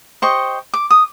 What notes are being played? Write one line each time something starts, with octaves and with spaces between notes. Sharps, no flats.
G4 C5 D#5 C#6
D6
D#6